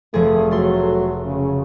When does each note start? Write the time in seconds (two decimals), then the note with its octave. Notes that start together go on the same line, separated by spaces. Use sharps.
0.14 F1 F3 A3 G#4
0.51 F#3 A3 C6
1.25 C#3